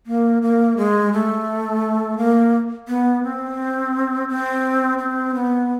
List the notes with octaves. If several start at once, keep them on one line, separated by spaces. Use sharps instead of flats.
A#3
A#3
G#3
A3
A#3
B3
C4
C4
C4
B3